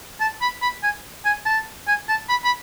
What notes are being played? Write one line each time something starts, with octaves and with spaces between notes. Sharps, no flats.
A5
B5
B5
G#5
G#5
A5
G#5
A5
B5
B5